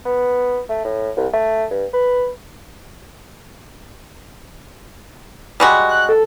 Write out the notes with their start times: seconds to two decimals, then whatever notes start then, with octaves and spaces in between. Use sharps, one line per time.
0.05 B3
0.69 A3
0.85 A2
1.17 C2
1.33 A3
1.71 G2
1.93 B4
5.60 G3 G#3 F#4
5.88 F#6
6.09 A4